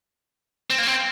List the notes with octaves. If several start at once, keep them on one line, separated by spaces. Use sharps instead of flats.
C4
A#3
C4